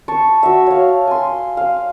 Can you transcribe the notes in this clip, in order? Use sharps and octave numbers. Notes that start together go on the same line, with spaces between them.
A5 C#6
F#4 E5
C#5 F5
G#5 C6
F5